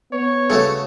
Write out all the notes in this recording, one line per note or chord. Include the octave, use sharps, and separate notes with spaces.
B3 C#5
C#3 A3 F#4 A4